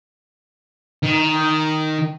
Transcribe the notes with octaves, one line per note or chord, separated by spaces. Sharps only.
D#3